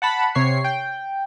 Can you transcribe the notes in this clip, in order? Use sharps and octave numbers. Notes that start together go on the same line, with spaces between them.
F#5 A5 B5
C3 C#5 C7
G5